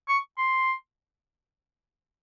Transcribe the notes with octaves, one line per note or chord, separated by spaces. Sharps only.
C#6
C6